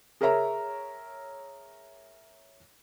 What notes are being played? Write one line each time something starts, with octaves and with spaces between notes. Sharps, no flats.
G#4 A#4 C#5 E5 A#5